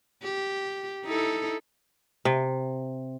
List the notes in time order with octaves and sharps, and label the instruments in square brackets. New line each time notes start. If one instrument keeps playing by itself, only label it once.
[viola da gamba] G4
D#4 E4 A4
[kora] C3